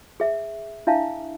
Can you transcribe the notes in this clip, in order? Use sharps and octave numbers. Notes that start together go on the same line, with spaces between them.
G#4 E5
D4 E4 E5 F5 A5